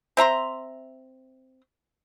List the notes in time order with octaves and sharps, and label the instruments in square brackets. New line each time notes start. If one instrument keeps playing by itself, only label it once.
[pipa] C4 E5 A#5 C6